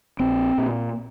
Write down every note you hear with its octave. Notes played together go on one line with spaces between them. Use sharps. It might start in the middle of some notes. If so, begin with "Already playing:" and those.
A#1 C4
A#2